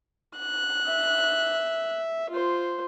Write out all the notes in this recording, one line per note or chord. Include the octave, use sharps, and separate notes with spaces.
F#6
E5
F4 C5